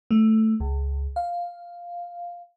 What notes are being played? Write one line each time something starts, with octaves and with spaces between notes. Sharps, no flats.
A3
C#2
F5